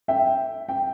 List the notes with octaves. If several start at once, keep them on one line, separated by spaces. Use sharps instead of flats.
E5 G5
G5